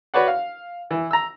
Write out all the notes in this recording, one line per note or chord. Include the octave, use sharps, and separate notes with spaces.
F#4 B4 C#5 D5 F#5
F5
E3
A#5 E6